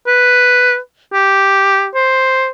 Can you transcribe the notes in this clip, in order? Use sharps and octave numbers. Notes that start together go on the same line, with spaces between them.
B4
G4
C5